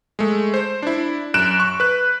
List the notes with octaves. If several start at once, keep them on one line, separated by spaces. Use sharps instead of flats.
G#3 A3
C5
D4 E4
F#2 F#6 D7 E7
C#6
B4 F#6